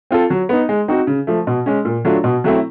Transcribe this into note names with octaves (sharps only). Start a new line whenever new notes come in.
C4 F4 A4
F#3
B3 D#4
G#3
C4 D#4 F#4
C#3
F3 A3
B2
G#3 C#4
A#2
F#3 A3 D4 F4
B2
F#3 A3 C4 E4